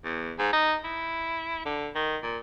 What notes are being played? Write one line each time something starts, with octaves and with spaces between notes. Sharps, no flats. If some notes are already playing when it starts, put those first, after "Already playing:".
E2
G#2
D#4
E4
D3
D#3
A#2